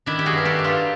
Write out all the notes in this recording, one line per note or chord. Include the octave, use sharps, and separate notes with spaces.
D#3 D4 E4
G4
F#4 G#4
G2
A#4
G4 A4
G2
F4 G4